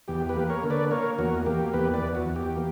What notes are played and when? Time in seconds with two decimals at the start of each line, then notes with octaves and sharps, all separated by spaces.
0.08 E2 G4
0.29 G4 B4
0.36 A#3
0.50 A#4 C#5
0.63 D3
0.70 B4 D5
0.91 A#3 A#4 C#5
1.18 E2 F#4 A#4
1.46 A#3 G4
1.73 E2 G4 B4
1.94 B4 D5
2.01 E2
2.15 F#4
2.29 E2
2.36 G4
2.56 A#3